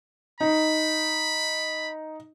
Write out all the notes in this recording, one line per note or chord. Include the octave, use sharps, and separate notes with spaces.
D#4 B5